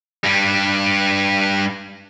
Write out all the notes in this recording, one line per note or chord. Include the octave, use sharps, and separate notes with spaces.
G2 G3